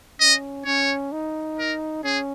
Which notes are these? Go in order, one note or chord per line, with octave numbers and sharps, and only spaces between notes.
C#4 D#5
C#4 C#5
D#4
A#4
C#4 G#4